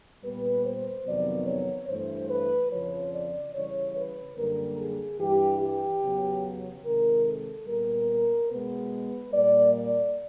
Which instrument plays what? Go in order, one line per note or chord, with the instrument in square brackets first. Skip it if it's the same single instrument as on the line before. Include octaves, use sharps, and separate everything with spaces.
[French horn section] A#2 G3 B3 B4
C5
F2 C3 D#3 F#3 B3 D5
C#5
G2 E3 A3 C5
B4
F2 C#3 F3 C#5
D5
C#3 E3 G3 C#5
B4
F#2 D3 G3 A#3 A#4
G#4
G2 E3 G3 G4
G4
E2 C#3 F#3 B3
C3 D#3 G#3 A#4
A4
A#2 G3 B3 A#4
B2 G#3 B3 B4
A#2 G3 A#3 D5
D5